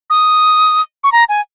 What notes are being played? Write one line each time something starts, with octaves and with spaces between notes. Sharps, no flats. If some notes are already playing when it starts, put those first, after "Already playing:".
D#6
C#6
A#5
G#5